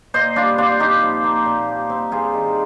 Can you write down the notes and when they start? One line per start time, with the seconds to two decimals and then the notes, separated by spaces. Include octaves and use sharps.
0.14 A#2 C5 D#5
0.36 G3 D4 F4
0.58 C4 D4 F4
0.80 A#2 D#4 G4
1.02 F3
1.24 A#3
1.46 A#2
1.68 G3
1.90 C4
2.12 G2 F4 G#4
2.33 D#3